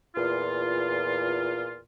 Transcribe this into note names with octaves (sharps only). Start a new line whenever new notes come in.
E2 A#2 F4